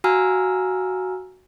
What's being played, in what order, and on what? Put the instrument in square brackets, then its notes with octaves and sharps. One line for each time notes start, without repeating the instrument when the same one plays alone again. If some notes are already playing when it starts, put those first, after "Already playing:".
[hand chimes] F#4 F5 G#5 A#5 E6 F6